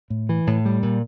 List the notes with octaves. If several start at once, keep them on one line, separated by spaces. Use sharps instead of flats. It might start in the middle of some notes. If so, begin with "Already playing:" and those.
A2
E3
A2
G3
A#2